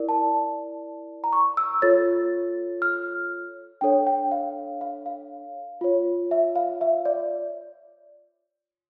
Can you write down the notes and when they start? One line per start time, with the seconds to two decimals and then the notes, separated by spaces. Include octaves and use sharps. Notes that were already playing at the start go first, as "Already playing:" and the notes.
Already playing: E4 A#4 D5
0.09 A5
1.24 A#5
1.33 C#6
1.57 E6
1.82 F4 A4 C#5 A6
2.82 F6
3.81 D4 A4 C#5 G5
4.07 G5
4.32 F5
4.81 F5
5.06 F5
5.81 F4 C#5
6.31 E5
6.56 F5
6.81 E5
7.05 D5